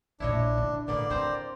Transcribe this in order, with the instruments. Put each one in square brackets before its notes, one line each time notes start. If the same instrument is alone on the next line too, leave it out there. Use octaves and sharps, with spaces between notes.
[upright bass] A#1 A#2 [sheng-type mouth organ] D4 [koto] E4 C#5 D#5
[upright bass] D3
[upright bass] A2 [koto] D3 A#3 B3 [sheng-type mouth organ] D5
[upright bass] D3 [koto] C4 C5 A#5